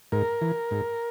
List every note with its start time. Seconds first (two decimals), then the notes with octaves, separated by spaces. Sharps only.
0.12 G#2 A#4
0.41 E3
0.71 G#2